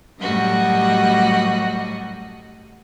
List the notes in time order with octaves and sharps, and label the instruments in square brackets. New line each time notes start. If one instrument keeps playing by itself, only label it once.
[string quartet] F#2 A2 G3 F#4 D#5